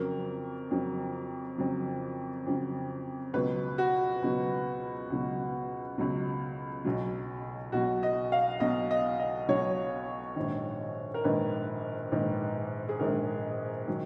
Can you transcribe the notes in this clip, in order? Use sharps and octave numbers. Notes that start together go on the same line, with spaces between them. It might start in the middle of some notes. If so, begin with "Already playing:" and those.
Already playing: F2 C#3 F#3 A#4
F2 C#3 F#3
F2 C#3 F#3
F2 C#3 F#3
C#2 B2 F#3 B4
F#4
C#2 B2 F#3
C#2 B2 F#3
C#2 B2 F#3
B1 B2 F#3
B1 B2 F#3 F#4
D#5
F5
B1 B2 F#3 D#5
D#5
D#5
B1 B2 F#3 C#5
A#1 G#2 D#3
A#4
A#1 G#2 D#3 B4
A#1 G#2 D#3
G#4
A#1 G#2 D#3 A#4
D#3 F#3